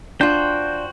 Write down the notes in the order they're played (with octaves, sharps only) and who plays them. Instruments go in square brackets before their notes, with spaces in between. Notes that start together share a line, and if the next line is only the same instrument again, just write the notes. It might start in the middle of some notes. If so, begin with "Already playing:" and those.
[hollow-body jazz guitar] D4 F4 [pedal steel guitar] F#4 C5 G5